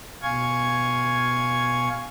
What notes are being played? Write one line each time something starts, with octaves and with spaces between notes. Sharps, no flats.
B2 F5 G#5 C#6 G#6